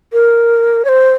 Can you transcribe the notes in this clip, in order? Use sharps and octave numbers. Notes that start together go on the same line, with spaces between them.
A#4
C#5
C5